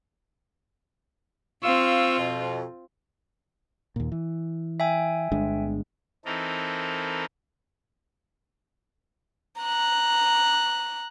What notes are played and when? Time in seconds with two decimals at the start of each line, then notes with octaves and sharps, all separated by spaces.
1.63 C4 F4 F5 C#6 E6
2.18 F2 B2
3.96 D#2 A#2
4.12 E3
4.80 E5 G5 G#5
5.32 G1 G#3 D4
6.25 E3 C4 D#4 A4 A#4
9.61 A#5 F#6